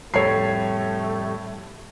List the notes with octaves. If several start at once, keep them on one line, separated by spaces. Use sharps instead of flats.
F2 A2 G3 A3 A4 C#5 C7